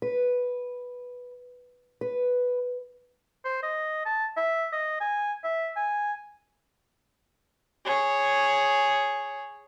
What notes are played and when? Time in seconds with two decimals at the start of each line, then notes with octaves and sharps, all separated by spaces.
0.02 B4
2.01 B4
3.45 C5
3.63 D#5
4.06 A5
4.37 E5
4.73 D#5
5.00 G#5
5.44 E5
5.76 G#5
7.85 G#4 C#5